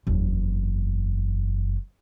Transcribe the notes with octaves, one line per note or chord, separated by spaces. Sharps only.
F#1 E2